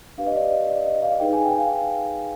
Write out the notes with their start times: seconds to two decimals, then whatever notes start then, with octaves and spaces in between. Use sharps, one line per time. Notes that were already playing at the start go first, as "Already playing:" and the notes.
0.18 D4 G4 B4 F5
0.27 D#5
0.35 D5
0.44 D#5
0.69 D5
0.86 D#5
1.02 F5
1.19 D#4 G#4 B4 G5
1.33 G#5
1.46 G5
1.58 F5